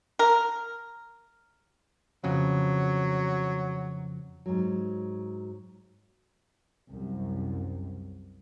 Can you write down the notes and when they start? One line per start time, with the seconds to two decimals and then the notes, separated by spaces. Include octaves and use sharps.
0.19 A#4
2.24 F2 C#3 F#3
4.46 G#2 F#3
6.90 C2 F#2